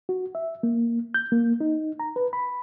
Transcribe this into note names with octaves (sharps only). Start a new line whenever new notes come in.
F#4
E5
A#3
G6
A#3
D#4
A#5
B4
B5